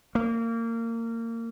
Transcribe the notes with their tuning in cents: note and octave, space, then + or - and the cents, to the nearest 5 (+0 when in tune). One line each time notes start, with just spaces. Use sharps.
A#3 -25